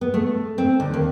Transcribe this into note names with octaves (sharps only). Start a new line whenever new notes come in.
B3
A3
C4
D2
D#2